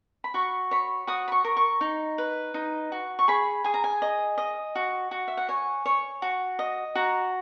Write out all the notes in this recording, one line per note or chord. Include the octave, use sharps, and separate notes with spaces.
B5
F#4 C#6
C#5 B5
F#4 D#6
B5
C#6
A#4
C#6
D#4
B4
D#4
F#4
C#6
G#4 B5
G#4 G#5
A#5
G#5
D#5
D#5
F#4
F#4
E5
F#5
C#5 G#5
C#5
F#4
D#5
F#4 A#5